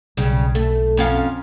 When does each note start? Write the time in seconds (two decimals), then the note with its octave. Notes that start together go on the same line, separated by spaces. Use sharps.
0.17 B1 C#3 G3
0.55 A3
0.97 F2 C#4 F5